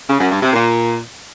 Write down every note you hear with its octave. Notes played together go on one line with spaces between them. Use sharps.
C#3
F#2
G2
C3
A#2